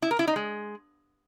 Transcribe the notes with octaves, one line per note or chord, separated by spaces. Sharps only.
E4
A#4
E4
D#4
G#3